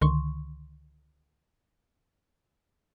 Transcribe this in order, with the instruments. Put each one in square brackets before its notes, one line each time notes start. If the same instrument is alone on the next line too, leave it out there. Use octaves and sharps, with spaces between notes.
[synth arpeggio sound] C#2 D3 D#3 C6 C#6